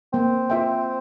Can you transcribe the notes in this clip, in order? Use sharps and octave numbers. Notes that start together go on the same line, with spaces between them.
A#3 C4
F4 C5 E5 G5